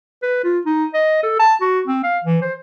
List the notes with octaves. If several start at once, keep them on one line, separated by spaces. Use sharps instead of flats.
B4
F4
D#4
D#5
A4
A5
F#4
C4
F5
E3
C5